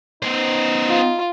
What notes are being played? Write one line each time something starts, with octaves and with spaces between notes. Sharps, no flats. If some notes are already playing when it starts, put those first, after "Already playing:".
B3 D#4 C5
F4